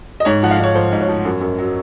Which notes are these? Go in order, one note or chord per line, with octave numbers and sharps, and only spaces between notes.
D#5
G#2 C#5
F3 F#5
F5
G#2 C#5
F3 C5
G#2
C#5
F3
F#2
F#2
F#3